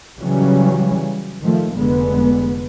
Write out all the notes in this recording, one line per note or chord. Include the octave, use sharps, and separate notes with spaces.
C#3 E3 F#3 G3 C#4
D#3 F3 A3
F1 D3 G#3 B3